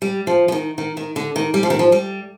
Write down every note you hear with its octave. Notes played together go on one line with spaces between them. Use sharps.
G3
F3
F3
D#3
D#3
D#3
D3
D#3
G3
F3
D#3
F3
G3